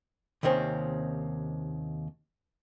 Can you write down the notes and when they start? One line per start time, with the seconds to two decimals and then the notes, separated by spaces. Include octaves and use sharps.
0.43 D#2 C3 D#3 C4 C#4